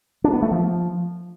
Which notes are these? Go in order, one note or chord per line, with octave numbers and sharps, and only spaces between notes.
D4
B3
A3
F3